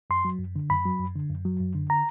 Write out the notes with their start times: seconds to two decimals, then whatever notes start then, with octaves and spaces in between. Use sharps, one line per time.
0.10 F#2 C6
0.25 F#3
0.40 F#2
0.56 D3
0.70 F#2 B5
0.86 F#3
1.00 F#2
1.15 D3
1.30 F#2
1.45 F#3
1.60 F#2
1.75 D3
1.90 A#5